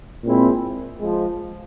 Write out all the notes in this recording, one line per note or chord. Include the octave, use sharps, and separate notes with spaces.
A#2 G#3 C4 E4
F3 G#3